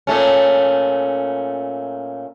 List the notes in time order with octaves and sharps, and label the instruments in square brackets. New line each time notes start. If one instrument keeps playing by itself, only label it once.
[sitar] A#2 A3 C#4